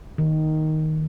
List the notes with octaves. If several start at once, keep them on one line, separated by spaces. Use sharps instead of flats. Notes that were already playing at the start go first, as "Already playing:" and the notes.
D#3